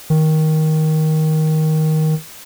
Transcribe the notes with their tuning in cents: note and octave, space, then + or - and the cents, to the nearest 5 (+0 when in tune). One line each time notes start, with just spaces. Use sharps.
D#3 +10